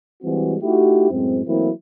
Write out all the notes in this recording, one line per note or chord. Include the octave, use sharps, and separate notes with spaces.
E3 G3 G#3 C4 F#4
A3 D#4 E4 F#4 G4
F#2 A2 G#3 C4
E3 F#3 A3 A#3 C4 E4